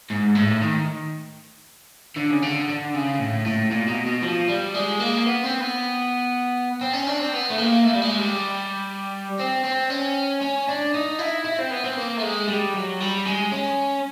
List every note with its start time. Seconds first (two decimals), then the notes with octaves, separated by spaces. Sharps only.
0.10 G#2
0.35 A2
0.62 D#3
2.17 D3
2.31 C#3
2.42 D3
2.68 D3
2.94 C#3
3.19 A2
3.46 A2
3.71 A#2
3.88 B2
4.06 B2
4.23 F3
4.49 G3
4.75 G#3
5.00 A#3
5.27 B3
5.44 C4
5.60 B3
6.81 C4
6.93 C#4
7.07 D4
7.19 C4
7.33 B3
7.50 A3
7.58 A#3
7.85 A3
7.94 G3
8.02 G#3
8.19 G3
9.39 C4
9.64 C4
9.90 C#4
10.42 C#4
10.68 D4
10.94 D#4
11.19 E4
11.45 E4
11.59 C4
11.71 B3
11.84 C4
11.97 A#3
12.17 A3
12.23 G#3
12.48 G3
12.74 F#3
13.00 G3
13.25 G#3
13.52 C#4